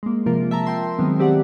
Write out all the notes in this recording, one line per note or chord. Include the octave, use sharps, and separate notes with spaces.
G#3 A#3
C3 F3 A#3 F4 A#4
E5 A5 A#5
G5 C6
D#3 F#3 G#3 B3 C4
C4 G4 D5 F#5